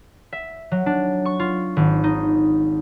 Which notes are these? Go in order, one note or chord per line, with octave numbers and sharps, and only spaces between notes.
E5
F#3
D4
C#6
F4
G#1
D#4